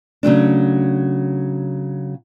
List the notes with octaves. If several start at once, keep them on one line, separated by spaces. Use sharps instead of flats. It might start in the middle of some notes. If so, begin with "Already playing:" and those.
C#3 F#3 A3 D4